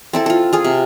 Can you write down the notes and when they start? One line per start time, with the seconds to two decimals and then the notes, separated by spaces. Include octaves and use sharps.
0.13 C4 E4 A4
0.26 F4 A4
0.53 F4 G#4
0.64 C3